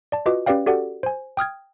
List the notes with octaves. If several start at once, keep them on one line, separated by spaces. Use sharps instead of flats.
D5 A5
F4 F#4 B4 D#5 D6
C#4 G4 B4 D5 F5 G5
F#4 G4 A4 D5 F#5
C5 G#5
G5 D#6 F6 G#6